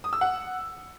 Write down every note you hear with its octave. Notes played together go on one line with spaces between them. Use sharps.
D#6
E6
F#5